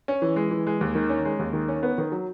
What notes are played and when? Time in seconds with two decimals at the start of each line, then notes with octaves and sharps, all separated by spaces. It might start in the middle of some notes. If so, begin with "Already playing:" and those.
0.08 C#4
0.22 E3
0.36 G#3
0.51 E3
0.67 G#3
0.81 D#2
0.95 D#3
1.09 C#4
1.25 G#3
1.39 D#2
1.53 D#3
1.68 C#4
1.83 B3
1.98 D#3
2.12 F#3